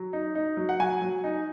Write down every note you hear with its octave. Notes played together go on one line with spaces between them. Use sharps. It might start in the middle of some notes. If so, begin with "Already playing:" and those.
Already playing: F#3
D#4
D#4
F#3
F#5
F#3 G#5
F#3
D#4